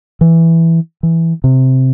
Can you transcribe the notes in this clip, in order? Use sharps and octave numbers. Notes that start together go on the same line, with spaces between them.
E3
E3
C3